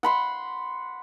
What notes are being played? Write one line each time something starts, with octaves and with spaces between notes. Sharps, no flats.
F#5 B5 C6